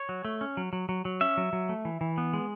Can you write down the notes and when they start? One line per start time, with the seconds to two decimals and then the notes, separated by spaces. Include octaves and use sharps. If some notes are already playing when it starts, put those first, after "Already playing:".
Already playing: C#5
0.09 F#3
0.25 A3
0.41 C#4
0.57 F#3
0.73 F#3
0.89 F#3
1.05 F#3
1.21 C#4 E5
1.37 F#3
1.53 F#3
1.69 A3
1.85 E3
2.01 E3
2.18 B3
2.33 G#3